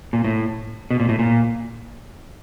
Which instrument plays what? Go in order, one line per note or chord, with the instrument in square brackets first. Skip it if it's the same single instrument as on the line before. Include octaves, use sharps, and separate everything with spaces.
[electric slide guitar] A#2
A2
B2
A#2
A2
A#2